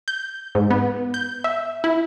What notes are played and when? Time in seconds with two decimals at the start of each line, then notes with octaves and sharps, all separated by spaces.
0.08 G6
0.55 G#2
0.71 B3
1.14 G6
1.44 E5
1.84 E4